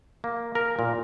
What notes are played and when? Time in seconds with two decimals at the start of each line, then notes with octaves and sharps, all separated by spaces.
0.24 A#3
0.55 A#4
0.79 A#2